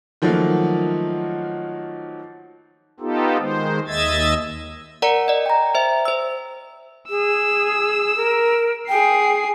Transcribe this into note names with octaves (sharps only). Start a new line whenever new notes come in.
D#3 F3 F#3 A3 A#3
B3 D#4 F4 G4 A4
D#3 G#3 C5
D#2 D#5 E5 E6 G#6 A6
A#4 D5 F#5 A#5 C#7
D5 D#5
G5 A#5
C5 E5
C5 E6
G#4 E6
A#4
G#4 G5 C7